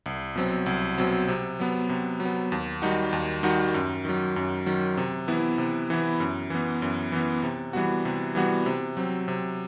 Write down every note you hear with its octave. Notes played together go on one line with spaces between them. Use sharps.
C2
B2 F#3 C4
C2
B2 F#3 C4
C3
F#3 B3
C3
F#3
B3
D#2
D#3 G3 D#4 F#4
D#2
D#3 G3 D#4 F#4
F#2
D#3 F#3
F#2
D#3 F#3
C3
E3 B3 E4
C3
E3 B3 E4
F#2
E3 B3
F#2
E3 B3
C3
E3 G3 B3 F#4
C3
E3 G3 B3 F#4
C3
F#3 C4
C3